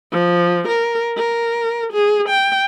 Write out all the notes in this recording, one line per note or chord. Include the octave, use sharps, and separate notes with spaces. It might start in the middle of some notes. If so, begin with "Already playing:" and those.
F3
A#4
A#4
G#4
G5